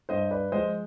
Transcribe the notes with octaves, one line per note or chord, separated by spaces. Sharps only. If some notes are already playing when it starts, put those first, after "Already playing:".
G2 C5 D#5
B4 D5
F3 G#3 C5 D#5